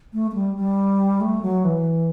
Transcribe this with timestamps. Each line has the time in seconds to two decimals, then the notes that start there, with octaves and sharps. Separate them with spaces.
0.14 A3
0.31 A3
0.35 G3
0.56 G3
1.21 A3
1.42 F#3
1.64 E3